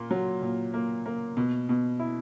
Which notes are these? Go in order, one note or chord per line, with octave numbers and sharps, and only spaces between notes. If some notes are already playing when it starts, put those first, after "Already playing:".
Already playing: A#2 A#3
F#3
A#2
A#3
A#3
B2
B2
E4